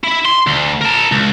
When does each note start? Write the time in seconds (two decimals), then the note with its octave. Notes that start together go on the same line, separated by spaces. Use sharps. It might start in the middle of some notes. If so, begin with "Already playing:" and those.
0.04 E4
0.26 C6
0.47 D2
0.81 A#4 A5
1.12 C#2